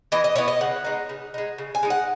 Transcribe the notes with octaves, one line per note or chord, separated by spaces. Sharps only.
E3 D#5
D#5
B3 E4 C#5
D#5
C#3 F#5
G#3 D#4
C#3
G#3 D#4
C#3
G#5
G#3 D#4
F#5